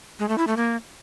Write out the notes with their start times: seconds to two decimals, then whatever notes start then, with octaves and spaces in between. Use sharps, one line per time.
0.19 G#3
0.29 A3
0.38 E4
0.47 A3
0.57 A#3